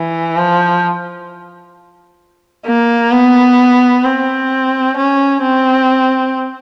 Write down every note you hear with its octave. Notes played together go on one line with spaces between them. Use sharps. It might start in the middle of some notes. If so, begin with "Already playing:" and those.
Already playing: E3
F3
A#3
B3
C4
C#4
C4